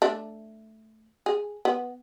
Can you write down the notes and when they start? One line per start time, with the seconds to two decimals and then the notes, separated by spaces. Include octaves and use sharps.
0.02 A3 D4
1.26 G#4
1.65 B3